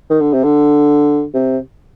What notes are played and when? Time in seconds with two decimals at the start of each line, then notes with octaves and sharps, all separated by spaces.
0.10 D#3
0.21 D3
0.33 C3
0.44 D3
1.34 C3